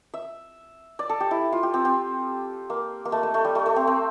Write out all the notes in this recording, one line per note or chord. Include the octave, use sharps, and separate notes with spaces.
E5
D5
A4
G4
E4
F4
G4
C4
C4
A#3
A#3
A3
A3
A3
G3
A3
A3
C4
C4